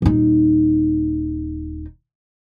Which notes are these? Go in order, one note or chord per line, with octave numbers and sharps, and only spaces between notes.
D#1 D#4